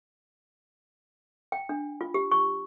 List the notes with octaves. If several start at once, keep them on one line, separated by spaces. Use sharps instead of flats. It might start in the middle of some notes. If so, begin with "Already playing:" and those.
G5
D4
F4
G4
C#6